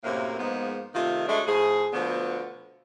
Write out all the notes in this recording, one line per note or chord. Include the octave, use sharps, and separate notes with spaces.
F#2 A2 C3 A#3
G#2 F3 G#3 A#3 B3
C3 D#3 A3 F4
F#3 G#3 A3 D4
A2 F3 G#4
B2 D3 F3 A3 B3